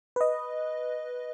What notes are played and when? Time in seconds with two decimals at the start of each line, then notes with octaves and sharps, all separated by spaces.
0.16 B4 D#5